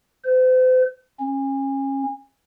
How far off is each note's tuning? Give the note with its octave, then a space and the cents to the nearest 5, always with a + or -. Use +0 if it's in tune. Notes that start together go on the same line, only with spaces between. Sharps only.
C5 -40
C#4 -30